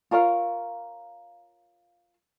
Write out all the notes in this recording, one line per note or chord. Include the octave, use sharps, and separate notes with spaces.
F4 A#4 C#5 F5